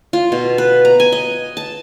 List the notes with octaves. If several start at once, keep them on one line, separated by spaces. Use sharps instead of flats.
F4
B2
B4
A#5
G#5
D#5
A5